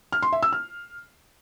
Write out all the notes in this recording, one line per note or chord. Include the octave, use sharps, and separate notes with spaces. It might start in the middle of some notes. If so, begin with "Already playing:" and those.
F6
C6
E5
E6
F6